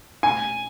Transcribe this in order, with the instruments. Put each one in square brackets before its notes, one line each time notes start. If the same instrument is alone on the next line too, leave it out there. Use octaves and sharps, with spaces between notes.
[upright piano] G#5